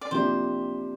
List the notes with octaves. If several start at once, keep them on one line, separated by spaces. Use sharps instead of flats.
D5
C3 F3 A#3 D4 G4 C5